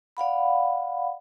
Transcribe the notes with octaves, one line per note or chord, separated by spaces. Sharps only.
D5 F5 F#5 B5